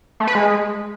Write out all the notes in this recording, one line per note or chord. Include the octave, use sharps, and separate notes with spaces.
A3
B4
G#3